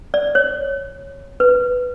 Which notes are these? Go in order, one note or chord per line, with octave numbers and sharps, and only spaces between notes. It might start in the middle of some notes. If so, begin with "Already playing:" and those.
D5
C#5
B4